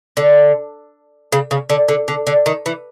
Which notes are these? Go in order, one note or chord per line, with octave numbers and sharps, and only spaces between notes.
D3
C#3
C#3
D3
D3
D3
D3
D#3
E3